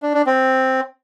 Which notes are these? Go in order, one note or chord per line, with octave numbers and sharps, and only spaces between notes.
D4
D4
C4